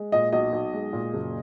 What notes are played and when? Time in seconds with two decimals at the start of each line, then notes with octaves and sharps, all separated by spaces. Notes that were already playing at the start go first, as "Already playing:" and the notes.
Already playing: G#3
0.12 A#2 D#5
0.32 B1 D#5
0.53 B1
0.74 G#3
0.93 A#2
1.14 F#1